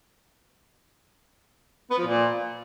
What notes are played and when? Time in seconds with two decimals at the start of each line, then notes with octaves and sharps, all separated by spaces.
1.90 B3
1.98 F3
2.06 A#2